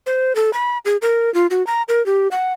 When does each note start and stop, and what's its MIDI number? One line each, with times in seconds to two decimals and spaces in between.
0.06 0.35 72
0.35 0.53 69
0.53 0.78 83
0.85 0.97 68
1.02 1.32 70
1.34 1.47 65
1.51 1.65 66
1.67 1.82 82
1.89 2.05 70
2.06 2.28 67
2.31 2.53 78